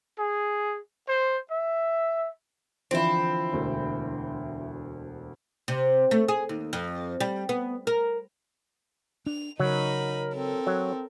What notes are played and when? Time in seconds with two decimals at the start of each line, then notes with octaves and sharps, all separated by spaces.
0.19 G#4
1.08 C5
1.51 E5
2.91 D3 E3 F3 C4 E4
3.52 E1 D2
5.68 C3
6.11 A3
6.28 G#4
6.49 D#2
6.73 F2
7.20 G3
7.49 B3
7.87 A#4
9.26 D4 F7
9.59 C#3 F#3 D#4 A#4 B5
10.35 C4 A4 A#4
10.67 F#3